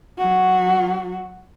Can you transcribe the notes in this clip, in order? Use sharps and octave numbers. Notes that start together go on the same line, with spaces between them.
F#3 F#4